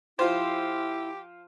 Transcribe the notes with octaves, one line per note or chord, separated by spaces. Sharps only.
F3 E4 F4 G4 C5